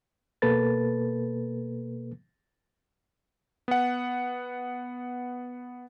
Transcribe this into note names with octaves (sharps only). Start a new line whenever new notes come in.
B2 A#3 A4 B4 A6
B3 F#5